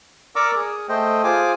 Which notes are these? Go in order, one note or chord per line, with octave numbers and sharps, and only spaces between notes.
A#4 D5 A#5 C#6 D6 E6
G#4
A3 C5 D#5 G5
F4 G#4 C5 G#5 D6